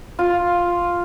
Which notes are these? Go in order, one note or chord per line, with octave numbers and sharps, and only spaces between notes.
F4